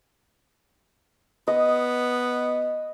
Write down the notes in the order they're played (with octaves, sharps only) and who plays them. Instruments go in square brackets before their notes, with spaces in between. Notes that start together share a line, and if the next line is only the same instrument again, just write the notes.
[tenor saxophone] B3 [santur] D#5